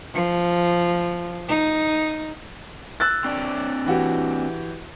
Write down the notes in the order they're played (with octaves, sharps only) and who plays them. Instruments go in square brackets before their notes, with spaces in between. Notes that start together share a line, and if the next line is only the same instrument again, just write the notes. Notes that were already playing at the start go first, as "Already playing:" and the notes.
[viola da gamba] F3
D#4
[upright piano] E6 F#6 A6
[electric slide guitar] C4 D4 D5
[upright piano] E3 F#4 G4